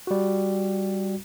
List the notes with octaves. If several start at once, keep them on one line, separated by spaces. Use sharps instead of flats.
G3 F#4